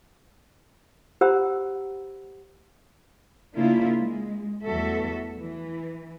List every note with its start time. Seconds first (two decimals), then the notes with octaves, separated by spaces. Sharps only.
1.21 G4 C5 F#5 A#5 B5 E6
3.54 C#3 A#3 D4 E4 F4
3.98 G#3
4.64 E2 G3 A3 F#4 A4 E5
5.37 E3